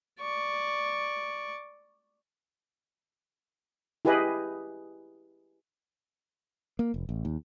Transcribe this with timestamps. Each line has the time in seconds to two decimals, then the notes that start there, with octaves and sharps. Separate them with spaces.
0.20 D5 C#6
4.05 E4 G4 G#4 B4 D#5
6.79 A#3
6.94 F1
7.09 A1
7.25 D#2